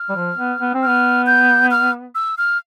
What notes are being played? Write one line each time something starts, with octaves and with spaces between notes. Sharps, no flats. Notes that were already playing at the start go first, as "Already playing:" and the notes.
Already playing: F6
G3
F3
B3
B3
C4
F6
B3
G6
F6
E6
F6